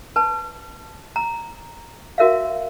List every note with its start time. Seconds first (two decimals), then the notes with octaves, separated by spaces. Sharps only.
0.16 B4 A5
1.16 A#5
2.18 F#4 A#4 E5 F5